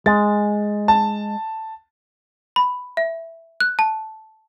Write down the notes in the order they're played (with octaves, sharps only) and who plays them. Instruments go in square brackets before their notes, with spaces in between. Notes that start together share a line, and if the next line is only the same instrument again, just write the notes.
[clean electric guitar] G#3 [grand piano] A6
[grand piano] A5
[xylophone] B5
E5
F#6
A5